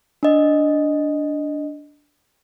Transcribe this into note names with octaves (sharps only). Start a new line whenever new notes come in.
D4 D#5